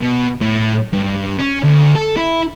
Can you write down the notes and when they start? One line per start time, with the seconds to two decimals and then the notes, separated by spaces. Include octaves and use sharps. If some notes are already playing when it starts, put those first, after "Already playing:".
0.01 B2
0.41 A2
0.93 G2
1.39 C#4
1.64 D2
1.95 A4
2.17 E4